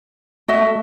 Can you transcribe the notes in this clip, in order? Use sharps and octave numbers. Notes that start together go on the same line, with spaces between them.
A3 F#4 D#5 E5